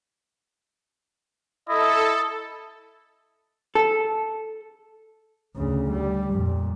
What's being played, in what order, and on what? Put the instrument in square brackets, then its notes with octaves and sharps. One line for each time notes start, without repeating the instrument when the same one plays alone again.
[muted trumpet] E4 [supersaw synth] A4 [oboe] D#5
[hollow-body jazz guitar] A4
[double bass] D2 C#3
G3
F2 A#2